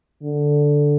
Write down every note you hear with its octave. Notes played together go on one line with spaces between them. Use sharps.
D3